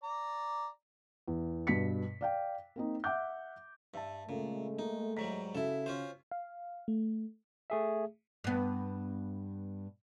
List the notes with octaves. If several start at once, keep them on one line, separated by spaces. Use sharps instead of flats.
D5 A#5
E2
G2 B2 B6 C#7
D5 F5 G5
A#3 C4 D#4
E5 F#5 D6 G6
G2 E5 A5
A#2 C#3 G#3 A3
A#3 D#4
G#2 F#3 G3 A#5 B6
C#3 E4 F#4 A4
C#4 F4 C5
F5
A3
A3 G#4 E5
G2 B3